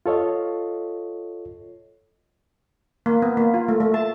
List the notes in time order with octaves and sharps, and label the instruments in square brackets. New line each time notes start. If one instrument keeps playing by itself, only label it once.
[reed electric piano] F4 A4 C#5 D#5 F5
[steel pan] A#3
B3
A#3
F4
A3
A3
A5